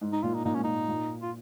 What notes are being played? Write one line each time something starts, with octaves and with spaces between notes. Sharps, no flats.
G#2
D#4
A#2 F4
D#4
A#2 D#4
G#2 C#4
A#2 D#4
A#2
F4